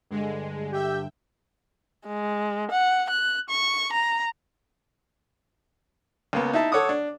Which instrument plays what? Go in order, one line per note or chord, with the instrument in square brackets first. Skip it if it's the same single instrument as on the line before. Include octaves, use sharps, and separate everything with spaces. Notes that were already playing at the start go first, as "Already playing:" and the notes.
[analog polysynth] G2 D3 [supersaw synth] G#3
[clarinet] G4 [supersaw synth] E5 G5
[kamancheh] G#3
F#5
F#6
C#6
A#5
[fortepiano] C#2 A#3 B3
D#4 E4 E5 A5
A4 C#5 F#5 D6 D#6
D4